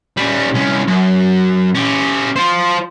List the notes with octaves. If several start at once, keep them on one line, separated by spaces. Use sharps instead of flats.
G3 C#4
C2 C#4
F#2
C#4 G4
F4 C5